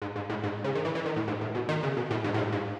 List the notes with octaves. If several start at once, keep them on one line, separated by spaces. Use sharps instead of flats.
G#2
G#2
A2
G#2
C#3
D#3
E3
E3
D#3
A2
G#2
A2
B2
D#3
C#3
B2
A2
G#2
A2
G#2
G#2